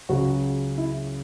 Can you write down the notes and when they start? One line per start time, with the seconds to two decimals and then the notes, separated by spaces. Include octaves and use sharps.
0.09 C#2 C#3 F#3 F#4
0.78 E4